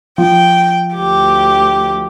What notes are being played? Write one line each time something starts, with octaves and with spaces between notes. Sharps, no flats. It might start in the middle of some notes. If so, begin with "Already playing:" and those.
F3 G5
D2 G4